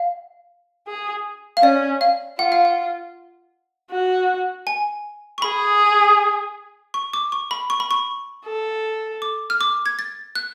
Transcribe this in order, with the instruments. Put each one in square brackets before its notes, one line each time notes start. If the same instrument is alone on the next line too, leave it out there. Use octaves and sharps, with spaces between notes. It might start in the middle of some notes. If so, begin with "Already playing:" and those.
Already playing: [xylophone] F5
[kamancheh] G#4
[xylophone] F5
[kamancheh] C#4 [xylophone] D5
[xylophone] F5
[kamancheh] F4 [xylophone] F#5
[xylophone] F5
F#5
[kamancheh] F#4
[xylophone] G#5
C#6
[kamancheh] G#4 [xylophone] B5
[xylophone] C#6
D6
C#6
B5
C#6
B5
C#6
[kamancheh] A4
[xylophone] D6
F6
D6
G#6
A6
F#6